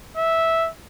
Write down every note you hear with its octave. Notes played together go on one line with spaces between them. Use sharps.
E5